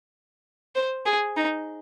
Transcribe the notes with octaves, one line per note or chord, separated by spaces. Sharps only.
C5
G#4
D#4